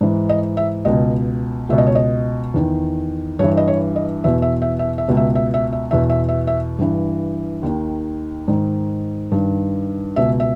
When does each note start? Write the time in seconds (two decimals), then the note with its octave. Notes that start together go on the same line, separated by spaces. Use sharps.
0.01 G#2 E3
0.29 D#5
0.57 E5
0.85 C#2 B2 D#5
1.69 C#2 B2 E5
1.78 D#5
1.87 C#5
1.95 D#5
2.54 E2 D#3
3.39 G2 E3 C#5
3.57 D#5
3.67 C#5
3.96 D#5
4.24 E2 B2 E5
4.42 E5
4.62 E5
4.79 E5
4.98 E5
5.08 C#2 B2
5.17 E5
5.35 E5
5.54 E5
5.73 E5
5.91 E2 B2 E5
6.10 E5
6.29 E5
6.47 E5
6.78 G2 E3
7.63 D#2 D#3
8.48 G#2 D#3
9.32 G2 D#3
10.16 C#2 B2 E5
10.40 E5